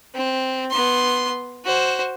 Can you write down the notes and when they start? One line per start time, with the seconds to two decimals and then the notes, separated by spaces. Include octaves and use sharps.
0.14 C4
0.71 B3 C6
1.65 F#4 C5